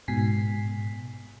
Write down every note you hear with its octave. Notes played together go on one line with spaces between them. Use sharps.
G#2 B2 G#5 B6 C7